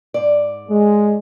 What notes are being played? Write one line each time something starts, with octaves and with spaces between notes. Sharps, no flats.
G#2 D5
G#3